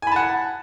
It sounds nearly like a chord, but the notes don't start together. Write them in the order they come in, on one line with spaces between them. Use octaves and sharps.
G#5 B5 A5 F#5